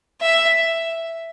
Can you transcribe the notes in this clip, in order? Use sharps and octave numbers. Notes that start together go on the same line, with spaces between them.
E5